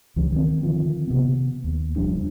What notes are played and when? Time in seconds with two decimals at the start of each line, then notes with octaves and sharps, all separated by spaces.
0.16 C#2 E3 F#3
0.32 D#3 C4
0.63 D3 D#3 F3
1.07 C3 B3
1.64 D#2
1.96 F1 F3 G3 D4